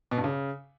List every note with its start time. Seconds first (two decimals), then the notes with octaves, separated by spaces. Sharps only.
0.11 B2
0.18 G2
0.24 C#3